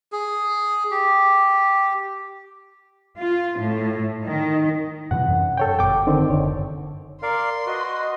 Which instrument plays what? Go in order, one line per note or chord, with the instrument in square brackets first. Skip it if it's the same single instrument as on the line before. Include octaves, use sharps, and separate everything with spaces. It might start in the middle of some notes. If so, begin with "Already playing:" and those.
[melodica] G#4
G4
[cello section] F4
A2
D#3
[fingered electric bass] G2 C3 E3 [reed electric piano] F#5
[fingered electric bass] F#2
[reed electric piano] A4 C#5 G5
[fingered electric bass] G1 B2 [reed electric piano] G5 D6
[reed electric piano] D3 D#3 C4
[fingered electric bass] F#1 D3 [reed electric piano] C#5
[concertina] A#4 D5 F5 [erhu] C6
[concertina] F#4 B4 [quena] D#5